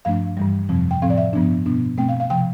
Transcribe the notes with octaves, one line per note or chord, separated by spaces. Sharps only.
G2 F3 A3 D4 F5
G2 E3 G3
F2 C3 F3 C4
G5
A2 F3 C4 F5
D5
E5
G2 F3 B3 D4
B2 B3 D4
B2 A3 C4 G5
F5
F5
C3 F3 G5